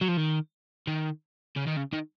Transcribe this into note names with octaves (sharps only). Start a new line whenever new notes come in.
F#3
F3
D#3
D#3
C#3
D#3
C#3
D#3